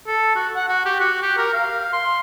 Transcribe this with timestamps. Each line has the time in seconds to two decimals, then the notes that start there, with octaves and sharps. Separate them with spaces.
0.07 A4
0.35 F#4
0.55 F#5
0.68 F#4
0.85 G4
1.00 F#4
1.22 G4
1.37 A#4
1.53 F5
1.93 C6